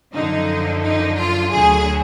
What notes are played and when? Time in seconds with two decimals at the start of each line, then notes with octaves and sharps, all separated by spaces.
0.14 F#2 D3 F3 D#4
0.83 D#4
1.16 F4
1.51 D2 D3 F#3 G#4